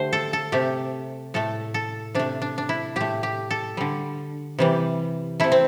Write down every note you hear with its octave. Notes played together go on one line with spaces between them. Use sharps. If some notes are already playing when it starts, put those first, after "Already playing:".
Already playing: D3 A3 G4 C5
A4
A4
C3 A3 G4
A2 A3 A4
A4
C3 A3 D4
D4
D4
E4
A2 A3 G4
G4
A4
D3 G3
C3 E3 G3
C3 A3 E4
C4